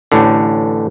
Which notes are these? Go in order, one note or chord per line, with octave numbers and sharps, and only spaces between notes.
A1 A2 D3